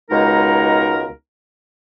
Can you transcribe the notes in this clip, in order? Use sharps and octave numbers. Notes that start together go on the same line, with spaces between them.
C#2 B2 G#3 D#4 A#4